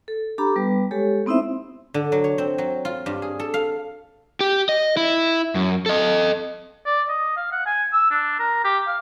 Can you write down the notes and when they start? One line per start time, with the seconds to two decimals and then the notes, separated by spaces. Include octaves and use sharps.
0.08 A4
0.38 D4 G4 A4 A#5 B5 D6
0.56 G3 B3 B4
0.91 G#3 G4 A4 C#5
1.26 B3 C4 D#4 E4 C5 E5
1.94 D3
2.12 F#3
2.24 C#5
2.38 C4
2.58 F#3
2.85 F4
3.06 G2
3.22 G#4
3.40 A4
3.54 F5
4.41 G4
4.69 D#5
4.97 E4
5.55 F#2
5.86 A4 D#5
6.86 D5
7.09 D#5
7.37 F5
7.52 F#5
7.66 G#5
7.93 E6
8.11 D4
8.39 A#4
8.65 G4
8.87 F5